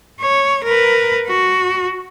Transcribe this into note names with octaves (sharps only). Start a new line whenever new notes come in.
C#5
A#4 B4
F#4